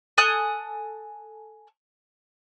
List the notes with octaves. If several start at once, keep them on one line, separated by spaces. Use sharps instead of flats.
A4 G#5 D#6 F#6